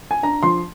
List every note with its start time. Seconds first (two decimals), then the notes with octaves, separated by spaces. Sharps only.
0.11 G#5
0.23 D4 A#5
0.43 F3 C6